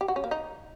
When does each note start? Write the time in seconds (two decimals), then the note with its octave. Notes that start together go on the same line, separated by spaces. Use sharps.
0.01 G4
0.08 F#4
0.16 C#4
0.24 A#3
0.31 D#4